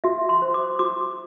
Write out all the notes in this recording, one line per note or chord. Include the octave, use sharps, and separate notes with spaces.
F#4 E5
C6
C5
D6
F#4 D6